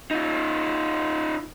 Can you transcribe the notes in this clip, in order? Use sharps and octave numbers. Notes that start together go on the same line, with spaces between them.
D#4 F4